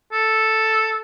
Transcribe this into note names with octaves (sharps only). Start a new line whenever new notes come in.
A4